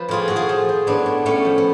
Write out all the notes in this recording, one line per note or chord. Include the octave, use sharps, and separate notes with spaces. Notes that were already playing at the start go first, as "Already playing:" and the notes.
Already playing: F3 B4
A2 F4 G#4
A2 F#4
F4 G#4
F3
F3
A2 B3 D4
A2
A2 A3 C#4
F3
B3